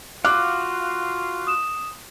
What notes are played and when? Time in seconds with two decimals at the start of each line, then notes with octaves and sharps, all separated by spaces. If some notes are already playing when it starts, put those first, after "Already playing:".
0.25 F4 F#4 F5 D6 F#6
1.47 D#6 E7